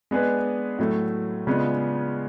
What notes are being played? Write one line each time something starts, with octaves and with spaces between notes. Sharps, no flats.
G#3 B3 D4 G#4 B4
A2 F#3 A3
C#3 G#3 B3 D4 F4